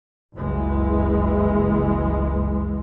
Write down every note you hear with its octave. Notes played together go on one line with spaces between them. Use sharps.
F#1 C#2 E3 G#3